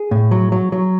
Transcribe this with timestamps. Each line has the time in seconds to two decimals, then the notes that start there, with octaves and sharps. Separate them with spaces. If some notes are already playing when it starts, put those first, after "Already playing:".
Already playing: G#4
0.11 A2
0.31 F#3
0.52 F#3
0.72 F#3